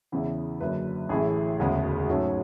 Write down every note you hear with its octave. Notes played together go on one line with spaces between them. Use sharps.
E2 C#3 E3 B3
F#1 F#2 D3 B4
A1 A2 E3 G#4
E1 D2 C#3 G#3 B3
G#2 F#3 A3 C#4